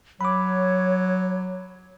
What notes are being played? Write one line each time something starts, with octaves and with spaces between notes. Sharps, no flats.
F#3 C#5 B5 D6